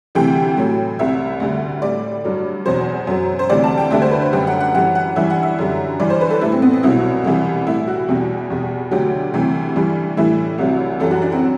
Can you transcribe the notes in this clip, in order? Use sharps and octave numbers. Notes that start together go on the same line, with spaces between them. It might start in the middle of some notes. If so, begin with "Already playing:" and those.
D2 C3 E3 G3 G5
A2 F#3
C2 C3 G3 E5
D2 D3 G3
A2 G3 D5
G2 F#3
E2 B2 F#3 C5
F#2 F#3
C5
D2 C3 E3 G3 D5
A5
G5
D2 D3 G3 E5
C5
B4
C5
F#2 D3 G3 G4
F#5
F#5
F#2 E3 G3 F#5
F#5
G2 E3 G3 E5
F#5
E5
F#2 D3 G3
G2 E3 G3 D5
C5
B4
A4
A2 G3 E4
C4
B3
C4
C2 B2 F#3 E4
C2 C3 E3 G3
A2 G3 E4
F#4
E2 B2 G3 G4
E2 B2 G3
D2 D3 F#3 G4
D2 C3 E3 G3
G2 E3 G3
A2 E3 G3 E4
C2 C3 F#3
F#2 E3 G3 A4
F#4
D4
C4
F#3